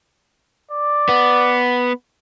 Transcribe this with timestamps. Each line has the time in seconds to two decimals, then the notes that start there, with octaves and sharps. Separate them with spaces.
0.71 D5
1.09 B3